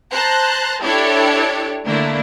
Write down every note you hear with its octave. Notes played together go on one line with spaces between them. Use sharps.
C5 A5 A#5 F#6
D4 E4 G4 A4 C#5 D5
D3 A3 A#3 D4 E4